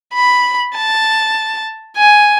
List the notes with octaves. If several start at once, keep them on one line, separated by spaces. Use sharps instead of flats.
B5
A5
G#5